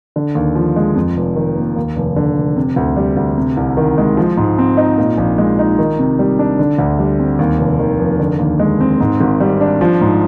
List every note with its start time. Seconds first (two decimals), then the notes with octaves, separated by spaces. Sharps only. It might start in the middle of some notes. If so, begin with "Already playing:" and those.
0.16 D3
0.35 D#2
0.55 F3
0.76 G#3
0.96 F2
1.17 F1
1.36 D#3
1.56 A#3
1.76 D#2
1.96 F1
2.16 D3
2.36 F1
2.57 C3
2.76 D2
2.97 G3
3.17 D2
3.38 C3
3.57 C2
3.77 D#3
3.98 G#3
4.17 F3
4.37 G#2
4.59 C4
4.77 D#4
4.98 A#2
5.18 A#1
5.38 G#3
5.59 D#4
5.79 D#3
5.99 C3
6.19 G3
6.39 D4
6.59 D3
6.78 D2
6.99 G3
7.19 C4
7.39 D#2
7.59 F1
7.79 D#3
7.99 F1
8.19 D3
8.39 D#2
8.59 G#3
8.80 C4
9.00 G#2
9.21 G#1
9.40 G3
9.61 D4
9.81 F3
10.01 G#2